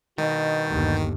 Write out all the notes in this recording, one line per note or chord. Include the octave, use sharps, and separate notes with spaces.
G2 B2 D#3 D#5 G6 A6
G1 D#2